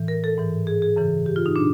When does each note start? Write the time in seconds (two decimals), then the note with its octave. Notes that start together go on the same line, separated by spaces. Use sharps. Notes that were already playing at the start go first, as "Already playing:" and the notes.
Already playing: A2 E3
0.08 A#4
0.24 A4
0.38 G#2 E3
0.67 G#4
0.82 G#4
0.96 F#2 C#3 E3
1.26 G4
1.36 F4
1.46 D#4
1.55 A#2 D4